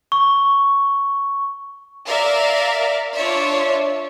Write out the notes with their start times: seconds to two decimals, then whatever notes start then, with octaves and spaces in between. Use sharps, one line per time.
0.12 C#6
2.08 A#4 D5 E5 F5
3.16 D4 F4 C#5 D5 E5